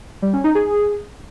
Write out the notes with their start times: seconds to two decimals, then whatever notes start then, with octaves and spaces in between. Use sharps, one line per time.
0.22 G3
0.33 C#4
0.44 D#4
0.55 G#4